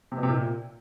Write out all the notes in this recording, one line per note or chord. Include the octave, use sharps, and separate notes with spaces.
C3
B2
C3
A#2